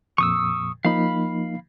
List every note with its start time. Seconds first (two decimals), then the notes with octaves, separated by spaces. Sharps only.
0.18 F2 A#2 C#6 D#6 E6
0.85 F3 A#3 D#4 F5 B5